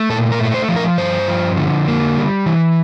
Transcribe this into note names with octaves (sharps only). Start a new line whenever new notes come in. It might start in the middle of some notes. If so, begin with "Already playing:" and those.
Already playing: A3
A#2 A4
A#4
A3
C5
F3
A#4
G2 C5
F3
D3
A#3
G3
E3